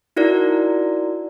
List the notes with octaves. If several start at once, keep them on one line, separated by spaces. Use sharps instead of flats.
D#4 E4 F#4 A#4 D5